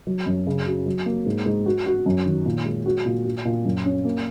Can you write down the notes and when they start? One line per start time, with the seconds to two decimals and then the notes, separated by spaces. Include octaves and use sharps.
0.07 F#3
0.26 F#2
0.47 C#3
0.66 F#4
0.86 F#3
1.06 A#3
1.26 G#2
1.46 G#2
1.66 F#4
1.86 F#4
2.06 F#2
2.26 D#3
2.46 A#2
2.65 G#3
2.86 F#4
3.06 A#2
3.25 F#4
3.45 A#2
3.65 F#2
3.85 C#4
4.05 A#3